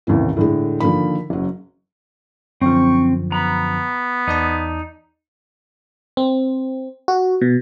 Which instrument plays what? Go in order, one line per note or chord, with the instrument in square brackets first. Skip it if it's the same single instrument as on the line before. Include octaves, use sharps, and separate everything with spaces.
[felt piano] A1 D#2 A2 C3 E3
A2 D3 G#3
D3 D#3 F3 A#3 B5
F#1 F#3
[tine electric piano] F#2 D3 F3 [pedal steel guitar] C4 [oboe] C#6
[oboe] B3 [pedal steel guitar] A#5 B5
[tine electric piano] E2 D5 A5 [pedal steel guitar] D#4
[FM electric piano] C4
F#4
B2